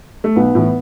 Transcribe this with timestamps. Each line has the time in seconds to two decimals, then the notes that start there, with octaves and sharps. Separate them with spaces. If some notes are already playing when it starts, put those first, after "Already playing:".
0.24 A3
0.36 B1 B3
0.55 A2 E3